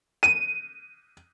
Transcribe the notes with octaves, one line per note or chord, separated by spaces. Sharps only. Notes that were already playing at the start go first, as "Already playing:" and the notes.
D#7